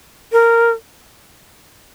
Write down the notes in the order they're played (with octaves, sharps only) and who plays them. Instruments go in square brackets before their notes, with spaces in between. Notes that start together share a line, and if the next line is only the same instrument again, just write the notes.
[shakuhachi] A#4